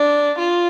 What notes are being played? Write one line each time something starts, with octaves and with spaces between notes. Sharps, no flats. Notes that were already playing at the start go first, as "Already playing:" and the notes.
Already playing: D4
F4